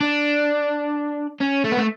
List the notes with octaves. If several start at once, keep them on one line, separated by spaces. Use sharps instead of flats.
D4
C#4
A3
B3
A3